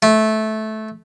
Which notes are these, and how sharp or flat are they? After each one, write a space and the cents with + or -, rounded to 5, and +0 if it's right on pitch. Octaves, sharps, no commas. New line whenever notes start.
A3 -15